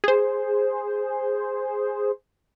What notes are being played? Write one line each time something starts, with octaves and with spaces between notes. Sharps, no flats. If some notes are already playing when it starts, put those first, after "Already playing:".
G#4 C5